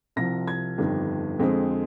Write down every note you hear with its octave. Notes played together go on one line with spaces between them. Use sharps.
C2 C3 F3 A#6
G#6
G1 F2 D#3 G3 D4
F2 D3 G#3 C4